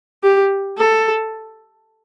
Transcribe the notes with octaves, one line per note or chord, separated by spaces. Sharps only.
G4
A4